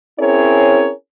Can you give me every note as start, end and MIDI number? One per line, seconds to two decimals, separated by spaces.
0.19 0.91 60
0.19 0.91 61
0.19 0.91 64
0.19 0.91 68
0.19 0.91 70
0.19 0.91 73